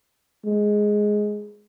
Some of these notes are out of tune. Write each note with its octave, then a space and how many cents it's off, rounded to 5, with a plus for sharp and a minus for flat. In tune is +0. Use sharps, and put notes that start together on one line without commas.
G#3 +5